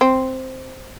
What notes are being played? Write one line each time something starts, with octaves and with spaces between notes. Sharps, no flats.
C4